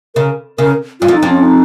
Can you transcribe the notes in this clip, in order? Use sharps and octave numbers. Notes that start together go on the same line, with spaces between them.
C#3 A#4
C#3 A#4
G2 F4
F2
D#4
F2
C#4
D#4